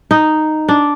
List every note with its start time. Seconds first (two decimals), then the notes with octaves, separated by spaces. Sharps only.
0.11 D#4
0.68 D4